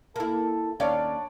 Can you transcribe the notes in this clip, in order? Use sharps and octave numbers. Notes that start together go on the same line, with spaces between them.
A#3 E4 A4
D#2 C#4 D4 C#5 D5 F5